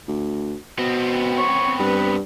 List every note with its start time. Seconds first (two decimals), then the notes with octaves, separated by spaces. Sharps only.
0.08 D2
0.79 B2 B3 C4
1.38 C#5
1.79 G2 B4